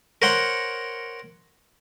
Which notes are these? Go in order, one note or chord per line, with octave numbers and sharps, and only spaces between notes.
A#4 C5 C#5 F#5 C6